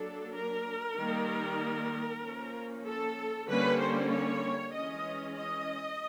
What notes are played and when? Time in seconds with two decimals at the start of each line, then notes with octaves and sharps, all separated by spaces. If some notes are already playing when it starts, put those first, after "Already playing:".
Already playing: F#3 A#3 D4 A4
0.34 A#4
0.97 D#3 G3 A#3
2.23 F3 A#3 C#4
2.85 A4
3.47 D3 G3 A#3 C#4 B4
3.79 C5
4.11 C#5
4.73 E3 G#3 C#4 D#5
5.36 D#5